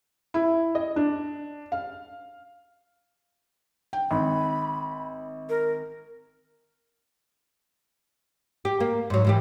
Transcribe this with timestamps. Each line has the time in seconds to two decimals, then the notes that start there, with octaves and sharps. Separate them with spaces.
0.34 E4
0.75 D#5
0.96 D4
1.72 F5
3.93 G5
4.11 G#1 B5
5.49 A#4
8.65 G4
8.80 A#3
9.10 G#2 F#3
9.25 G#2 E3 G4